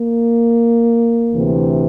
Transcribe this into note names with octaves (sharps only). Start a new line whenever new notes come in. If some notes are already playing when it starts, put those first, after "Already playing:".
Already playing: A#3
D2 C3 E3